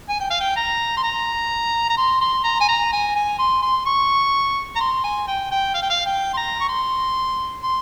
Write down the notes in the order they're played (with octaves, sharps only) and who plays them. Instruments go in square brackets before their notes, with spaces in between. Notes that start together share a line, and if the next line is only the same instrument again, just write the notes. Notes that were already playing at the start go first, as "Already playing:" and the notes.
[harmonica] G#5
G5
F5
G5
A#5
C6
A#5
A#5
C6
C6
A#5
G#5
A#5
G#5
G#5
C6
C6
C#6
A#5
C6
G#5
G5
G5
F5
G5
F5
G5
C6
A#5
C#6
C6
C6